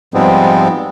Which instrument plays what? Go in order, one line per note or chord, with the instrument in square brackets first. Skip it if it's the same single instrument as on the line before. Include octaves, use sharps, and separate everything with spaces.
[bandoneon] G#2 F3 G3 G#3 B3 C4